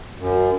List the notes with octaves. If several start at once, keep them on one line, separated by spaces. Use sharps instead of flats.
F#2